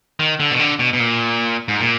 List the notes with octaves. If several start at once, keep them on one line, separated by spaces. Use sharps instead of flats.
D#3
D3
B2
D3
B2
B2
A#2
G#2
A#2